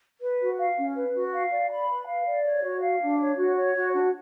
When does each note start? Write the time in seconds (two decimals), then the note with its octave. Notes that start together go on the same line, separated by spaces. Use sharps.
0.21 B4
0.39 F#4
0.59 F5
0.77 C#4
0.95 B4
1.14 F#4
1.33 F5
1.50 D5
1.70 B5
1.88 B4
2.06 F5
2.26 D5
2.43 C#5
2.63 F#4
2.81 F5
3.00 D4
3.19 C#5
3.37 F#4
3.55 C#5
3.74 F#4
3.93 D4